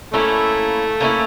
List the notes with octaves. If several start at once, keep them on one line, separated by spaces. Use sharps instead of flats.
A3 A#3 C#4 E4
A#3 C#4 E4